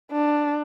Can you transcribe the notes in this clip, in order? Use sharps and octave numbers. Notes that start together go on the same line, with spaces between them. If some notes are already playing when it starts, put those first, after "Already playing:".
D4